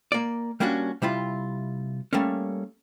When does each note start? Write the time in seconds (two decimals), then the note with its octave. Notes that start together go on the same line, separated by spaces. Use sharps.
0.12 A#3 D5
0.60 G3 A#3 C#4 D4 F#4
1.02 C3 G3 E4 F4
2.13 G3 A3 A#3 C#4